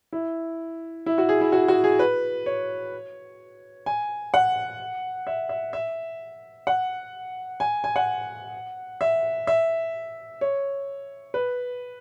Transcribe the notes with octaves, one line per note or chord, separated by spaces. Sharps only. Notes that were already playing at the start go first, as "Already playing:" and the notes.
E4
E4
F#4
G#4
E4
F#4
F#4
G#4
B4
C#5
G#5
F#5
E5
E5
E5
F#5
G#5
G#5
F#5
E5
E5
C#5
B4